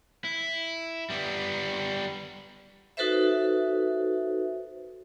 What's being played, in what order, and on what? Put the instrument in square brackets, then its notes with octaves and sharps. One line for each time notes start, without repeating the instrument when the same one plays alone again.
[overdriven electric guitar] E4
G3 B3
[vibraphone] D#4 F#4 A4 B4 C5 E5